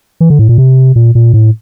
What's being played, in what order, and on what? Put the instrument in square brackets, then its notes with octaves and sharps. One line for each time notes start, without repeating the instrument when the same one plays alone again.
[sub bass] E3
D3
A2
A#2
C3
A#2
A#2
A2